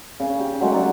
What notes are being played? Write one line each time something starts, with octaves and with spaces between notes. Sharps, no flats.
C#3 C#4
G4
F#3 G#3 A3 F#5
D5 F#5 A#5